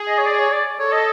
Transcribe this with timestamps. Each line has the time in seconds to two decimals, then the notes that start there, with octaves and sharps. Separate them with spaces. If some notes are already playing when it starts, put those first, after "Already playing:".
Already playing: G#4
0.08 D#5
0.18 C#5
0.26 D5
0.39 C#5
0.52 D5
0.78 A4 C#5
0.92 D#5